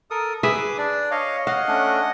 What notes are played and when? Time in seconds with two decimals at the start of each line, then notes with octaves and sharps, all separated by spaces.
0.11 A4 A#4 D#6
0.43 G#4 B4 E5 D6 D#6
0.78 D4 D5
1.11 C#5 D#5 F5
1.47 D#5 F5 F#5
1.68 A3 C#4 D4